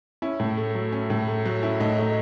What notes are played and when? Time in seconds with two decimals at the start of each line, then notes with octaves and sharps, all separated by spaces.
0.22 C#4 E4
0.40 A2
0.57 A3
0.75 F#3
0.92 C#4
1.10 A2
1.28 A3
1.45 F#3
1.63 C#4 E4
1.80 A2 D#4
1.98 A3 D#4